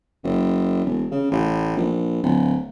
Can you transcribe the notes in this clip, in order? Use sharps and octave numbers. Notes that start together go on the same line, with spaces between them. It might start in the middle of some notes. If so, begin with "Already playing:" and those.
F#1
E1
C#3
A1
A#1
D1